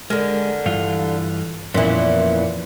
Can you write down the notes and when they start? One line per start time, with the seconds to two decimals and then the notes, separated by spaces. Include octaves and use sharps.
0.10 D3 G#3 A#4
0.66 G2 E3 F4
1.74 F2 A#2 E3 B3 C#4